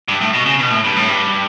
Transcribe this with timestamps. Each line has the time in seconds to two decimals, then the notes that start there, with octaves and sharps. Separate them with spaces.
0.08 G2
0.21 A2
0.33 B2
0.46 C#3
0.59 B2
0.71 A2
0.84 G2
0.96 A2
1.08 G2